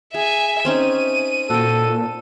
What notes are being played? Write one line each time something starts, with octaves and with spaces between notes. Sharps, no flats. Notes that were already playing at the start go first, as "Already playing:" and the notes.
G#4 E5 G#5
C4 C#4 D#4 D#7
A#2 F#4 A4 G5